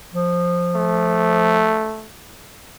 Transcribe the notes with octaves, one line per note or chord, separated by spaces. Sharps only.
F3
A3